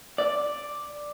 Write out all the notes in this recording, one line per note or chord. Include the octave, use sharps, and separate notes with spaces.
D5